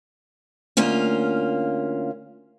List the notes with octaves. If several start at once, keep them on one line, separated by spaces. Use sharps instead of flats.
D2 A#3 C#4 F4